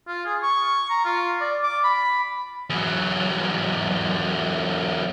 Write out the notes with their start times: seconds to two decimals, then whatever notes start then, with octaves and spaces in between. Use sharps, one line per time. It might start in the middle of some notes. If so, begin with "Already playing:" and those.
0.08 F4
0.26 G#4
0.42 C#6
0.90 A#5
1.05 F4
1.41 D5
1.63 D6
1.84 B5
2.70 E2 F#3